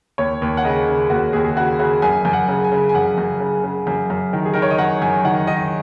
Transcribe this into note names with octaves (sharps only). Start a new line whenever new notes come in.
D#2 C#5
D#2
F#5
C#3 D#5
C#3
D#2 F#4
D#2 G#4
G#4
C#3 F#4
C#3 F#4
F#2 G#5
F#2
F#5
C#3
G#5
C#3
G#5
F#2 F#5
F#2
C#3
C#3
F#2
F#2
D#3
G#4
D#3 A#4
C#5
D#5
F#2 F#5
F#2 G#5
D#3 F#5
D#3 D#5